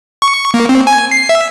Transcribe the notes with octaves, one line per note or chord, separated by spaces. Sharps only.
C#6
A#3
C4
G#5
C7
E5